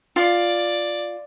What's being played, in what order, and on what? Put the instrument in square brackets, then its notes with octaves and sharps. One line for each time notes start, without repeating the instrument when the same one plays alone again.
[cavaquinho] F4 [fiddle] D5